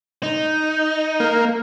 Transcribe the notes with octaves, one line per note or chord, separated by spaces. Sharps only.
D#4
A#3